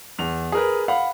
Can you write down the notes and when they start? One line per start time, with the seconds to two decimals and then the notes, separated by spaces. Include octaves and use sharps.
0.19 E2 F7
0.52 G#4 A#4 B4
0.88 F5 F#5 B5